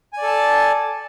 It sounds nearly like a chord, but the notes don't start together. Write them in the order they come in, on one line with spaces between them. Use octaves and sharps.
G#5 D5 A4 A5